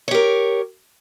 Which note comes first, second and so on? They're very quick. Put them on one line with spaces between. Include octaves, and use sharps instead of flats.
C#5 G4 A#4